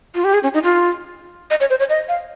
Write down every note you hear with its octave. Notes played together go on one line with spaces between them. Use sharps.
F4
G4
G#4
C#4
D#4
F4
D#5
C#5
C5
C#5
D#5
F5